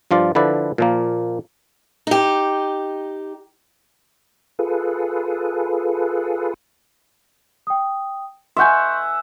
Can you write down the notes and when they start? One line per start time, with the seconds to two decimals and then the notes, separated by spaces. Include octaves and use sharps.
0.11 G2 F3 F4 D5
0.35 D3 F3 E4 B4 D5
0.78 A#2 F3 A#3
2.07 D#4 G4
4.59 F4 G#4 A4 B4
7.67 G5 D#6
8.57 E5 F#5 G#5 C6 C#6 G6